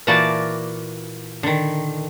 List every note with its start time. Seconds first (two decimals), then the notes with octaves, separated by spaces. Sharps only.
0.07 A#2 E3 A#3 F#4 D5 A5
1.43 D3 D#3